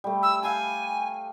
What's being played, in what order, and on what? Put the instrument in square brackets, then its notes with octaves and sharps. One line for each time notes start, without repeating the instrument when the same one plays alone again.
[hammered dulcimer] G3 A3
[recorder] E6
[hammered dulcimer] F5 G5 [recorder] G#5